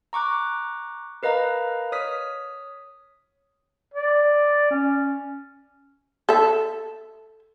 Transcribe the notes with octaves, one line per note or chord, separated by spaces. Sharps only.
A#5 C#6 D6 F#6
A#4 B4 D#5 F5 A#5
C#5 D#6 F6 B6
D5
C#4
A4 E5